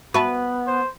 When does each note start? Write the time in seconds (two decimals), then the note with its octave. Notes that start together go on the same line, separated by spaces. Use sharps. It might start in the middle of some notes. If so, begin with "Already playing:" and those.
0.14 B3 F#4 B4 E5 A5
0.67 C5